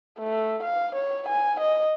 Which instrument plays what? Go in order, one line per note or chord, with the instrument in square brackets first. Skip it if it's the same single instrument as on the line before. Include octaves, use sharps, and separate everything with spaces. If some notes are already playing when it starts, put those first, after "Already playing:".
[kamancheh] A3
F5
C#5
G#5
D#5